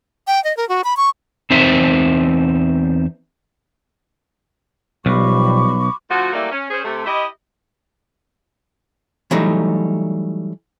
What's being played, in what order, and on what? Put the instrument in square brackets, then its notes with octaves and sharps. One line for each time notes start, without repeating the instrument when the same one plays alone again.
[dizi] G5
D#5
A#4
F#4
B5
C#6
[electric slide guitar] E2 C4 D#4 C5 E5
[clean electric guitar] B1 [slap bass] B2 [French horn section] F3 G3 [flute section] B5 C#6 D6
[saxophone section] D3 F3 A3 F4 F#4
F#3 G3 A3 A#3 E4 D5
C#4
C#4 G#4 C5
C3 A3
E4 G4 D#5
[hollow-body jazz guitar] E3 F#3 G3 A3 D#4